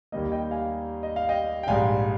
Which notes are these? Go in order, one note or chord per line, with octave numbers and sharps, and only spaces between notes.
D#2 D#3 G3 A#3 D#5
D#5 G5
F5 G#5
D#5
F5
D#5 G5
G5
A#1 G#2 G3 F5 G#5